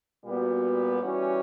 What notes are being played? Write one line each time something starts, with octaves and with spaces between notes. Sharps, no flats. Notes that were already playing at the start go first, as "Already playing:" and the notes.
A#2 G3 B3 F#4
E3 G3 C#4 F#4